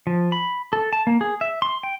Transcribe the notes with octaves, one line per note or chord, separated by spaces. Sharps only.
F3
B5
A4
A5
A#3
G#4
E5
C6
G5